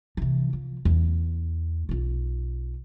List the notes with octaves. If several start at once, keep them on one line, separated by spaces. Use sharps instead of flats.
C3 E3
F3
E2
B1 F4